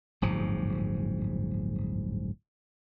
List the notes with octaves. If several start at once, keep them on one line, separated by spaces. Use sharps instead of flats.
D1 G1 G#2 F3